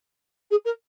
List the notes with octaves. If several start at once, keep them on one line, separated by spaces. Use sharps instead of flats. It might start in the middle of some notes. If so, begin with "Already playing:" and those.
G#4
A#4